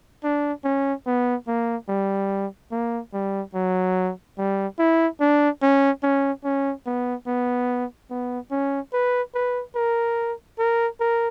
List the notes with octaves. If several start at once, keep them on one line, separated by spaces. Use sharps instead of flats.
D4
C#4
B3
A#3
G3
A#3
G3
F#3
G3
E4
D4
C#4
C#4
C#4
B3
B3
B3
C#4
B4
B4
A#4
A#4
A#4